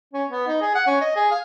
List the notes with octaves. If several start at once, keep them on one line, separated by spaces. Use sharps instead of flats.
C#4
B3
D#4
G#4
F#5
C#4
D#5
G#4
F5